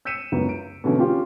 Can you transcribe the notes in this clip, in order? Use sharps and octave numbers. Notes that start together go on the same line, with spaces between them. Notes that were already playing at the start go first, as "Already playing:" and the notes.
E6 G6 B6 C#7 D#7 E7
C#2 F#2 B3
D7
B2 D3 E3 C#4
C#4 F4 G4